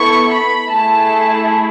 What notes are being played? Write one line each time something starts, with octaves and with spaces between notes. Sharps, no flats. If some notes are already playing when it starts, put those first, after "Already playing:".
Already playing: B3 E4 A4 C#6
B5
A3 E4 G#4 A5